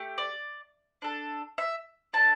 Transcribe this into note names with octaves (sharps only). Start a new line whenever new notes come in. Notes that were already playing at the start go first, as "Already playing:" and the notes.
Already playing: A3 G4
D5
D4 A4
E5
D4 A4 A5